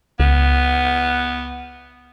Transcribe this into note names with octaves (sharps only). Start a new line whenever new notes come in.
C#2 B3